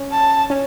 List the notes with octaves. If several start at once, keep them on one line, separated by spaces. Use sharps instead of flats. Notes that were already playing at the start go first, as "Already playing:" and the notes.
Already playing: C#4
A5
C#4